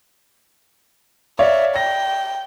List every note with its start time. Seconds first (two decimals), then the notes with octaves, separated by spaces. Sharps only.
1.39 C#5 D5 E5 F5
1.76 G5 A#6